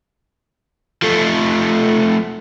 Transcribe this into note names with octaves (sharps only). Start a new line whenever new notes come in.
F3 A3